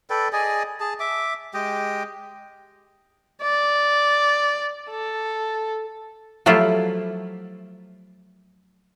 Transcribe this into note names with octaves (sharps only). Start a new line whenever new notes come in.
A4 B4 D5 G5
G#4 D5 D#5 G#5
G#4 A5
E5 D6
G#3 G4 D#5 G5
D5
A4
F3 F#3 A3 E4 F4 G4